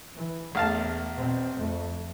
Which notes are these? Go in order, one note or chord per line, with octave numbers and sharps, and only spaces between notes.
E3
A#1 E2 A3 F5 A5
B2 C4
F2 A3